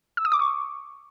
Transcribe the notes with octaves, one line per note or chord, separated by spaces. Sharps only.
E6
D#6
D6
C#6